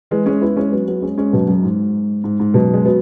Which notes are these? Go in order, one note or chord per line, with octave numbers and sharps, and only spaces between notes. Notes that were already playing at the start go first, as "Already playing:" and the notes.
E3 G#3
G#3 C#4
B3 E4
G#3 C#4
F#3 B3
F#3 B3
G#3 C#4
G#3 C#4
F#2 B2
F#2
G#2
G#2
G#2
F#2 B2
G#3
F#3 B3